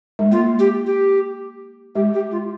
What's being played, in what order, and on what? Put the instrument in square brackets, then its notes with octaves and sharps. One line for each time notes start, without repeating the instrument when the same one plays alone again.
[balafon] G#3
[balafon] A#3 [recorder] F4
[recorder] G4
G4
[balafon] G#3 [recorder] G4
[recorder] G4
F4